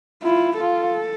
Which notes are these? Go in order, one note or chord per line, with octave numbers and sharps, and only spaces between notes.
E4 F4
F4 A4